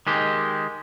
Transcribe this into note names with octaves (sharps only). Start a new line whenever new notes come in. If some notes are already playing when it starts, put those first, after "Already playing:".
D#3 G#3 G4